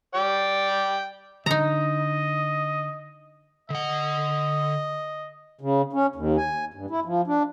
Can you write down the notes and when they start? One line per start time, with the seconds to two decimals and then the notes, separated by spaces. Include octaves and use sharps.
0.15 D5 G5
1.46 D3 D#4 D#5 A#5
3.70 D3 D#5 F#5
5.61 C#3
5.93 C#4
6.15 D#2
6.37 G#5
6.74 G2
6.90 E4
7.05 F3
7.27 D4